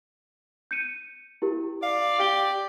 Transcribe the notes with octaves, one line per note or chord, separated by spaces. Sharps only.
G6 C#7 D#7
E4 G4 A#4
D5 F5
G4 D7 G7